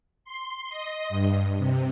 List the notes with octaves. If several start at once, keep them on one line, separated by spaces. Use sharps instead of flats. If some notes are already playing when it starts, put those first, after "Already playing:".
C6
D#5
G2
C3